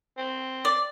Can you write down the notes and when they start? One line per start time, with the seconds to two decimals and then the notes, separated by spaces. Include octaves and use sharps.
0.18 C4
0.65 D5